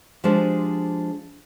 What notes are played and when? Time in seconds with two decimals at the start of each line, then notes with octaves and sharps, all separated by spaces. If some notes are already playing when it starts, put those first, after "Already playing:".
0.24 F3 G#3 D4 G4 G#4 C5